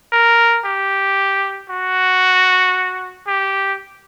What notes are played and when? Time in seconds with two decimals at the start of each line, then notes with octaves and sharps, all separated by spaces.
0.12 A#4
0.65 G4
1.70 F#4
3.27 G4